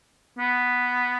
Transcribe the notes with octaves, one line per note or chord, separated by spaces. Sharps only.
B3